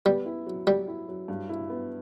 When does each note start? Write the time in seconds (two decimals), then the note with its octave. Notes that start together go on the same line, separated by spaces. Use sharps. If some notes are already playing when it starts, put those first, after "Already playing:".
0.05 G3 B3
0.26 E4
0.46 F#3
0.67 F#3 G3
0.88 E4
1.08 F#3
1.28 G2
1.49 E4
1.70 B3